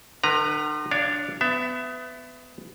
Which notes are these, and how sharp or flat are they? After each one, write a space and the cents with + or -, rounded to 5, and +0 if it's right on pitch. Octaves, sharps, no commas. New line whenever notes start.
D3 +45 B4 +0 A#5 +5
D4 +0 C#5 +30 F5 -20
B3 +25 E5 +15